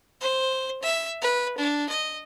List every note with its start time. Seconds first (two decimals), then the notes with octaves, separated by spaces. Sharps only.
0.21 C5
0.82 E5
1.22 B4
1.58 D4
1.89 D#5